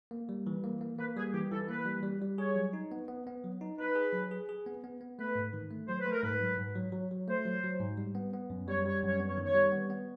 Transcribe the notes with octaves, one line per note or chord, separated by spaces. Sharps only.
A#3
G3
E3
A#3
A#3
A#3 B4
G3 G#4
E3 G4
E3 A4
A#3 B4
G3
G3
G3
G#4 C#5
F#3
D#4
B3
B3
B3
F#3
D#4
D#4 B4
G#4
F#3
G#4
G#4
B3
B3
B3
A3 B4
G#2
D#3
A3
F#3 C5
B4
A3
A#4
G#2 B4
F#3
G#2
F#3
F#3
F#3
A3 C5
F#3
F#3
G#2
G3
B3
B3
F#2
G3 C#5
G3 C#5
F#2 C#5
B3
C#5
D#3
C#5
G3
B3
B3